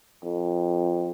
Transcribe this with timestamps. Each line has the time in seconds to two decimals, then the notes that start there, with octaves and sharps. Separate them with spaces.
0.24 F2